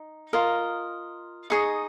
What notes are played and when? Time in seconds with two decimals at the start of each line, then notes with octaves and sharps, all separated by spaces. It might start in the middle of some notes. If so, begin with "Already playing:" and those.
Already playing: D#4
0.33 F4 A#4 D#5
1.50 D#4 G#4 D#5 C#6